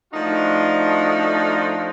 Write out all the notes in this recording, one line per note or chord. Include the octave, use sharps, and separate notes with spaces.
F3 A3 D4 D#4 F4 F#4